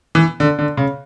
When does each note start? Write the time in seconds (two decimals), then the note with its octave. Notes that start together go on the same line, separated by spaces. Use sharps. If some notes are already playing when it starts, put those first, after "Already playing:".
0.15 E3
0.40 D3
0.59 D3
0.77 C#3